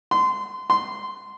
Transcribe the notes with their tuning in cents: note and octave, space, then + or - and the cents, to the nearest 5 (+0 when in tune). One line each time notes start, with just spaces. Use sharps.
C6 -25
C6 -15